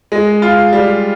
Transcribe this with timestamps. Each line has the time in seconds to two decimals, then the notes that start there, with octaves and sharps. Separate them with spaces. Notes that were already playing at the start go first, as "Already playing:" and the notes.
0.12 G#3
0.42 F4
0.73 G3